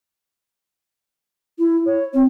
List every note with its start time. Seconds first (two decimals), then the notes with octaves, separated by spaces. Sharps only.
1.58 E4
1.86 C#5
2.14 C4